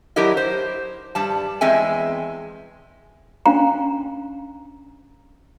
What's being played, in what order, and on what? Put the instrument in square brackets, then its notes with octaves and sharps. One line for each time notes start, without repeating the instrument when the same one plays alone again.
[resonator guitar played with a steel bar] F#3 D4 E4 G4 A#4 D#5
C5
G2 G3 A5
E2 G#3 C4 E5 G5 G#5
[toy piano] C#4 D4 F5 A#5